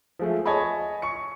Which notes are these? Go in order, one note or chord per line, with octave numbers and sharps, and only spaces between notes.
F3 G#3 A3
C#5 D#5 G#5 A5 B5
C#6 C#7